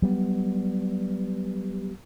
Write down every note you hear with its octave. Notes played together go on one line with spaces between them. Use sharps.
F#3 G3 B3